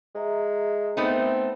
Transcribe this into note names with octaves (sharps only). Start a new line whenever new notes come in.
G#3 G#4 E5 A#5
A3 B3 C4 D#4 A#4 E5